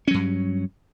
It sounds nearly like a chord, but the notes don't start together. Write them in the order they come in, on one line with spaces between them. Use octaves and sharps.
C#4 F#3 G2